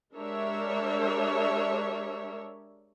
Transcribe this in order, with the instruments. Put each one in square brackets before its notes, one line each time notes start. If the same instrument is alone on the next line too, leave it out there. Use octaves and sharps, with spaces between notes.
[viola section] G#3 D4 G4 A#4 C#5 E5